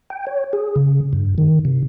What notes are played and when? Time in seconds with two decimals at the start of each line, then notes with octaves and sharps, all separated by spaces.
0.10 G5
0.27 C#5
0.53 G#4
0.76 C#3
1.13 G2
1.38 D#3
1.65 C3